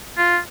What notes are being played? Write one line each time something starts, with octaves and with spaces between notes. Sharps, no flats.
F4